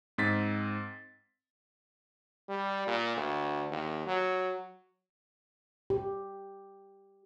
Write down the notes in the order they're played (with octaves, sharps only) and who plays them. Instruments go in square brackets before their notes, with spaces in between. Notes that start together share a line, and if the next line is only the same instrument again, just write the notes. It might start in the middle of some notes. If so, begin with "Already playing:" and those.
[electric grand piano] G#2 C4 A6 B6
[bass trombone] G3
A#2
D2
D#2
F#3
[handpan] G4